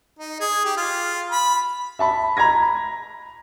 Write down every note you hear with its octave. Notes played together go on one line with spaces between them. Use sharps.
D#4
G#4
G4
F4
B5
E5 A5 B5
A#5 B5 G#6 A#6